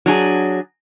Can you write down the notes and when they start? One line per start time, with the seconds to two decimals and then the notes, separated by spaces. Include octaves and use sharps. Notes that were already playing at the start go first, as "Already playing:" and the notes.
0.06 F#3 D4 G4 G#4